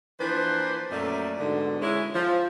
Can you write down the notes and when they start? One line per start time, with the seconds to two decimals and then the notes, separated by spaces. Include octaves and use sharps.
0.19 E3 F3 A#3 D4 B4 C5
0.90 F#2 A#2 F#3 A3 D5 E5
1.39 G#2 B2 D3
1.80 G#3 C#4 E4
2.13 F3